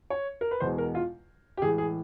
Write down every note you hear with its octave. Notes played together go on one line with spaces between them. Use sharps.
C#5
A#4
B4
E2 B2 G#3 C5
A#4
F4
G4
A2 E3 G#3 G#4
G#4